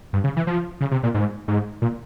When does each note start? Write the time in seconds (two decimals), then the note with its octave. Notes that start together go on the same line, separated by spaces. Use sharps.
0.13 G2
0.24 C#3
0.36 E3
0.47 F3
0.81 C#3
0.91 C3
1.03 A#2
1.14 G#2
1.48 G#2
1.82 A#2